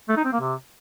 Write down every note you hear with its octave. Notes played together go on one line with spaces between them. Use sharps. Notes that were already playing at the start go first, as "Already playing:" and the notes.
A3
D#4
C4
A#3
C3